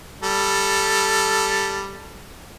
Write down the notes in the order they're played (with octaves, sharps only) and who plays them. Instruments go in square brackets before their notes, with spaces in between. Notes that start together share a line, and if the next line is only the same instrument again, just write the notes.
[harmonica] G3 A4